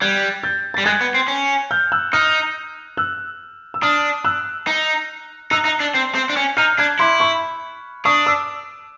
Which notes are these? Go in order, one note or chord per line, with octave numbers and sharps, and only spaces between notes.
G3 F#6 G#6
G6 A6
G3 A6
G#3 F#6 G#6
B3
C4
C#4
F6 G6
E6 F#6
D#4 D#6 F6
E6 F#6
E6
D4 D#6 F6
E6 F#6
D#4
D#4 E6 F#6
D#4
D4
C4
C4
D4
C#4
D#4 F6 G6
D4 F#6 G#6
E4 C6 D6
B5 C#6
D4 C#6 D#6
D6 E6